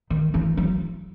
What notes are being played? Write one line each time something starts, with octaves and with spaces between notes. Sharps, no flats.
D#3
E3
F#3